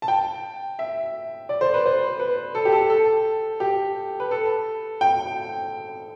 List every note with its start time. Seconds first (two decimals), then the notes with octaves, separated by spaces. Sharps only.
0.02 A5
0.08 G5
0.79 E5
1.49 D5
1.61 C5
1.74 B4
1.86 C5
2.20 B4
2.55 A4
2.65 G4
2.72 A4
2.90 A4
3.60 G4
4.20 B4
4.31 A4
5.01 G5